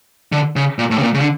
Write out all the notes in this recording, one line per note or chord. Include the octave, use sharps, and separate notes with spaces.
D3
C#3
A#2
A2
C#3
A#2
C#3
D3